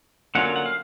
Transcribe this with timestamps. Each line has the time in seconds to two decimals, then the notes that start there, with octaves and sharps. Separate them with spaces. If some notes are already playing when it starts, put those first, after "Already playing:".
0.35 D3 F#3 A#3 C#4 F4 F#5
0.56 F#5
0.66 F5